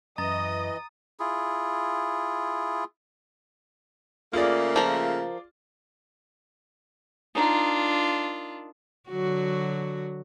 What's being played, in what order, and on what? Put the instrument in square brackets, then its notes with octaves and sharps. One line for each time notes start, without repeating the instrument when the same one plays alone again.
[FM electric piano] F#2 [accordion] E3 D#5 [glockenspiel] A#5 A6 [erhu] D#6
[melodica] E4 F4 G#4
[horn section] C#3 A3 A#3 [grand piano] F4 G#4 D5
[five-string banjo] F3 A#4
[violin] D4 F4 [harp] D#4 A#4
[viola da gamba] D3 F#3 F#4